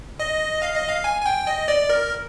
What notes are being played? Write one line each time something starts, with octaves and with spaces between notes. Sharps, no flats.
D#5
F5
D#5
F5
G#5
G#5
G5
D#5
D5
A#4